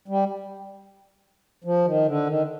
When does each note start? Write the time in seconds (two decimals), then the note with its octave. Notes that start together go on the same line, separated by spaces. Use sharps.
0.08 G3
1.64 F3
1.85 D#3
2.06 D3
2.27 D#3